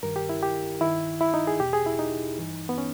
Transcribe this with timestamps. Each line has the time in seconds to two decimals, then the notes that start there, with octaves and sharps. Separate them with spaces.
0.03 G2 D#3 A#4
0.16 G4
0.29 E4
0.42 G4
0.81 G2 D#3 E4
1.21 E4
1.34 D#4
1.47 G#4
1.60 E2 B2 G4
1.73 G#4
1.86 E4
1.99 D#4
2.39 G2 E3
2.69 B3
2.78 C#4